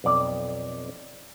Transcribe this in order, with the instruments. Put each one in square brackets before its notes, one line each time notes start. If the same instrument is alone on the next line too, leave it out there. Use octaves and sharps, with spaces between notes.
[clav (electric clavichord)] B1 F2 D5